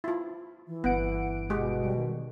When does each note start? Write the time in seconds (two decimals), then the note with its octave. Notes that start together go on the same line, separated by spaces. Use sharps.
0.04 E4 F4
0.67 E3
0.84 G1 B3 F#5 D7
1.50 B2 G#3 G4
1.82 G3
1.97 D#3